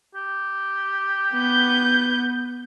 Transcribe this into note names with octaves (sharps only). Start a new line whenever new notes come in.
G4
B3 G6